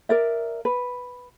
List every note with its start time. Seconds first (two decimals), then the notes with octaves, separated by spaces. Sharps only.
0.09 A#4 D5 E5
0.65 B4